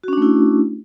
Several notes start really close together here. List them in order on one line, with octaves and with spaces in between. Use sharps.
F#4 C#4 D4 A3 E4